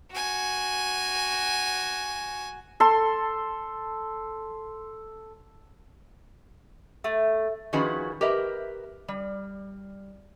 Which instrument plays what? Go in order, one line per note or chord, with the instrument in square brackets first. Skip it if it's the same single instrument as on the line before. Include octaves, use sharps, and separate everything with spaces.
[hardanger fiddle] F#4 G#5
[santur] A4 C6
[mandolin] A3
[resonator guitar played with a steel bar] D#3 F3 C#4 F#4 G#4 B4
G4 A#4 B4 D#5 E5
G3